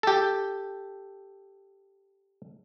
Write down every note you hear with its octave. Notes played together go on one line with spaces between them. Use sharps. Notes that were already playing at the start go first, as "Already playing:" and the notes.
G4 A4